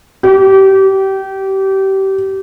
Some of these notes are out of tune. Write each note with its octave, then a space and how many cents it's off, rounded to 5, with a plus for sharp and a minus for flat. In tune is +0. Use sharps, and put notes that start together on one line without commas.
G4 -25